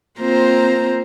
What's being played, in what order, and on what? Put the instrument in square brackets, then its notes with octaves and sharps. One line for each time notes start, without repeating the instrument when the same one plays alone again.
[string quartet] A#3 C4 F4 C5 A#5